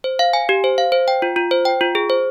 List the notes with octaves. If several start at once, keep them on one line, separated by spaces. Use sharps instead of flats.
C5
F5
G#5
G4
C5
F5
C5
G5
F4
F4
C5
G5
F4
G#4
C5